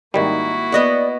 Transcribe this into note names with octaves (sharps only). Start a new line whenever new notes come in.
G#1 D#3 G3 A#3 D#4 E4 F#4
B3 D5 D#5 F#5